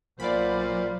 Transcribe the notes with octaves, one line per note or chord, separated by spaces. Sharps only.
B1 A#2 F#3 C5 D5 F5 B5